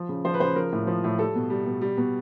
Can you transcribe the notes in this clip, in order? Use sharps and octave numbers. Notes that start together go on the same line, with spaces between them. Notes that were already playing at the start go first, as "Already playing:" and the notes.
Already playing: F3
C#3
F3 C5
B4
C#3 C5
F3 A#4
A2
F3
A2
G3 A4
B2
G3
B2
G3
B2